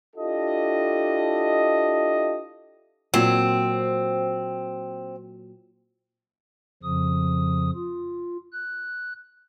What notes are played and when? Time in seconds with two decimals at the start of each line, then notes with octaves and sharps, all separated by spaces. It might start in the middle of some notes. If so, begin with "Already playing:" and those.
0.16 D4 E4 F4 G4 A4 D#5
3.14 A#2 F#3 C4
6.83 F2 C#3 F3 D#6
7.75 F4
8.53 F#6